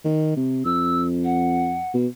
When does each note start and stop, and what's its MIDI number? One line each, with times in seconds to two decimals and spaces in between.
0.05 0.34 51
0.37 0.62 48
0.65 1.82 41
0.65 1.02 88
1.24 1.91 78
1.94 2.07 47